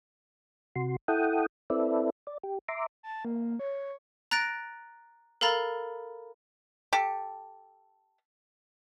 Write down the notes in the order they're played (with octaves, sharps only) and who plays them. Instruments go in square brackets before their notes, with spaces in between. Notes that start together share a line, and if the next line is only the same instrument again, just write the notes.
[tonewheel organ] C3 F#4 C6
E4 A4 F#5 G5 D#6
C4 E4 A4 B4 D5 E5
D5
G4
E5 A#5 C6 D6
[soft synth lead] A5
A#3
C#5
[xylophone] A#5 F#6 A6 A#6 D7
A4 A#4 F5 A#5 B5 A6
[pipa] G4 A4